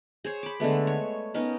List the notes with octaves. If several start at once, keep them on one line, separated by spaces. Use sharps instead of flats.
G#4 C5 C#5
B5 D6
D3 G#3 A3 B3
C#5
B3 C#4 D#4 A#4